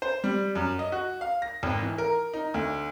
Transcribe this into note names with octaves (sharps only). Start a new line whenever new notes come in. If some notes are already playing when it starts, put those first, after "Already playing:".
C5
G3
F#2
D#5
F#4
F5
A#6
G#1
E3
A#4
D#4
D2